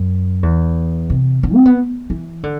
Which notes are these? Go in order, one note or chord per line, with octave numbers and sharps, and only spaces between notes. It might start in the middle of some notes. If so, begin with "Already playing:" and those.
Already playing: F#2
E2
C3
D3
C4
B3
E3
D3